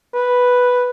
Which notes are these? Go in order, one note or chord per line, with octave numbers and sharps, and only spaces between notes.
B4